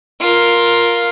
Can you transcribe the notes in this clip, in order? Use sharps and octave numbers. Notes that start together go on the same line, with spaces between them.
F4 A#4